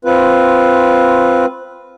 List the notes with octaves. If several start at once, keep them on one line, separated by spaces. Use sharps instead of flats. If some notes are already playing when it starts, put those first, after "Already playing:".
C4 F4 B4